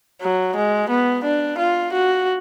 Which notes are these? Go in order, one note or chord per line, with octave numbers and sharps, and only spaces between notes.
F#3
G#3
B3
D4
F4
F#4